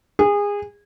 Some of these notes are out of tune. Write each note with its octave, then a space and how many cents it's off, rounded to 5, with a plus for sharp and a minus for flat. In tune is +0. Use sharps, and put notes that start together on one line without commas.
G#4 -25